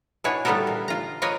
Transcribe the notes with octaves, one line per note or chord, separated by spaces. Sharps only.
B2 D4 E4 C#5 G#5
D3 G3 A3 B3 A4 A#4
A#2
F4 A#5
F4 A#4 B4 C#5 D#5